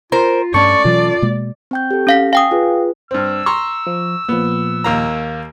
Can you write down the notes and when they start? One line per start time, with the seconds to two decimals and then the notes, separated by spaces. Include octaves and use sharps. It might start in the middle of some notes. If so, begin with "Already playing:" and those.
0.12 F4 A#4 C5
0.54 G2 A3 C#4 D5 C#6
0.85 B2 E3 F#3 F4
1.22 B2 G#3 A#3
1.71 C4 G5 G6
1.91 G4 A4
2.07 C#4 F5 B6
2.33 F5 G5 G#5 D#6
2.51 F4 G#4 B4
3.11 G2 C4 E6
3.46 A#5 C6 C#6
3.87 F3
4.29 A#2 F3 B3
4.84 D#2 A#3 A#5